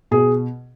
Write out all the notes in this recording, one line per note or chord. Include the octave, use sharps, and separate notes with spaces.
B2 G#4